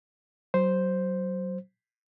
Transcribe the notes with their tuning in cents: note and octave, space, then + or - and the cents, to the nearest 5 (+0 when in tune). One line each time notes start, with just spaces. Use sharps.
F#3 +25 C5 +0